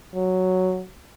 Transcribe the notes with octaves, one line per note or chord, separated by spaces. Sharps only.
F#3